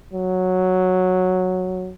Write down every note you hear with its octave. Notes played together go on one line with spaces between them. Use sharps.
F#3